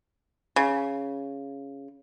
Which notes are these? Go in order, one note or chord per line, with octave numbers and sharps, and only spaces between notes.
C#3